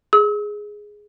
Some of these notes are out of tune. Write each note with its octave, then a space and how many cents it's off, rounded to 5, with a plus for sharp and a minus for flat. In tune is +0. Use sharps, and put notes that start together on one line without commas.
G#4 +0 E6 -40